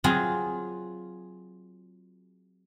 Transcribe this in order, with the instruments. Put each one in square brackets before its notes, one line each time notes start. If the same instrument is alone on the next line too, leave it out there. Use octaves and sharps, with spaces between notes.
[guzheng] F#3 C4 F4 G#4